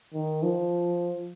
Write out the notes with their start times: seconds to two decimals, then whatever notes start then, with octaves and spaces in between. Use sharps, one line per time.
0.14 D#3
0.43 F3